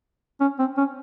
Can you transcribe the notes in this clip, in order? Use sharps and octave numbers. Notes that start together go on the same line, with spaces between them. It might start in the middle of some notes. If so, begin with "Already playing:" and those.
C#4
C4
C#4